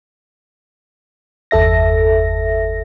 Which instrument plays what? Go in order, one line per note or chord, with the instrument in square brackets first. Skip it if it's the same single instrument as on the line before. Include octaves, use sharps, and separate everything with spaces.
[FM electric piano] G1 E2 A4 E5 A#6